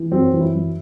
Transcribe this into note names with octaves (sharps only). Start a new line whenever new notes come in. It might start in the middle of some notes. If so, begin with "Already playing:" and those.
Already playing: E3
F#2 C4
E3
E4
F#2